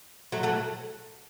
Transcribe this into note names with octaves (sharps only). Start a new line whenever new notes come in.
F#3 A3
F#3 A3